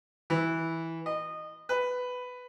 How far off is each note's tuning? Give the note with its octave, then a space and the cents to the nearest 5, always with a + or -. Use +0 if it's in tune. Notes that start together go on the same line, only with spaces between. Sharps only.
E3 -10
D#5 -20
B4 +10